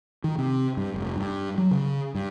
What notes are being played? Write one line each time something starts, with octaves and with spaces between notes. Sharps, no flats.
D#3
C3
G2
F1
G2
F#3
C#3
G2